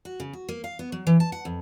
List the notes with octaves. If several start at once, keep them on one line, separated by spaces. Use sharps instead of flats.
F#4
C#3
F#4
A#3
F5
B3
F#3
E3
A5
F#5
F2